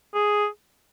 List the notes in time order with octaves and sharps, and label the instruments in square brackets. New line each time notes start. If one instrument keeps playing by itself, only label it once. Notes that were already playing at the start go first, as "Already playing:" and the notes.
[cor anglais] G#4